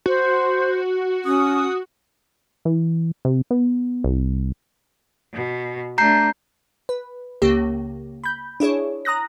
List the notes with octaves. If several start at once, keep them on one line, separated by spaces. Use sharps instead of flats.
F#4 C5
C#4 D#6
E3
C3
B3
C2
B2
A3 D4 A#5 G6 C7
B4
C#2 C#3 A#3 G4
B5 G6
D4 E4 G#4 C#5
A#5 D#6 F#6 A#6